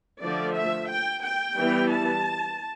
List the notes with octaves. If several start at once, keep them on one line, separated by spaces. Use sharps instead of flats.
D3 F3 A3 D5
E5
G5
G5
E3 G3 B3
A5